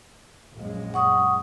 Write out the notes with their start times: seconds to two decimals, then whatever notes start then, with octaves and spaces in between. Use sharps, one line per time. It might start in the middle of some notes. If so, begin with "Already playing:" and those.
0.57 A#1 F#2 G#3
0.94 F#5 C#6 D#6